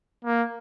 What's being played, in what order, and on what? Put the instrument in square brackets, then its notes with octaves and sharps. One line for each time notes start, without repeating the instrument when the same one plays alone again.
[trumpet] A#3